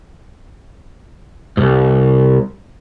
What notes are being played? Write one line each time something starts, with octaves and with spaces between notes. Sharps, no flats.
C2 G#2